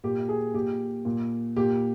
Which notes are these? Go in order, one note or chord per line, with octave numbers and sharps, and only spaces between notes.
A#2 G4
G#4
A#2 G4
A#2
A#2 G4